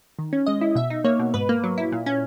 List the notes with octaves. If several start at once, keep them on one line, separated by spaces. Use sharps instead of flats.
D#3
C#4
G#3 D#5
E4
B2 E5
D#4
A#3 C#5
B2
G#2 B4
A#3
F#3
E4
A#2
C#4